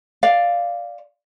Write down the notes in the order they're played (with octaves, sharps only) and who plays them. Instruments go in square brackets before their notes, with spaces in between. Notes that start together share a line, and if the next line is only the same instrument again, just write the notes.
[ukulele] D5 F5